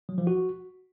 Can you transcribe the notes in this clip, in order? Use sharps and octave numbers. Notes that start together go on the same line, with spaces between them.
F#3
F3
F#4